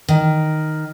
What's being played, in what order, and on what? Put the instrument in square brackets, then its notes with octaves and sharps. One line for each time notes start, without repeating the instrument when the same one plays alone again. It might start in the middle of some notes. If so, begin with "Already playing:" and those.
[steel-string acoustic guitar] D#3